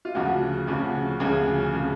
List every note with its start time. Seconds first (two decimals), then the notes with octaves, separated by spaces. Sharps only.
0.05 F4
0.15 D2 C#3 F3 F#4
0.67 D2 C#3 F3
1.20 D2 C#3 F3 G#4
1.73 C#3 F3